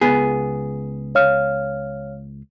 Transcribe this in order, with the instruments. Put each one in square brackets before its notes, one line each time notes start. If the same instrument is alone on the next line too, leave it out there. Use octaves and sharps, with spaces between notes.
[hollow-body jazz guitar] C#2 B3 G#4
[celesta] C#5 F5 F6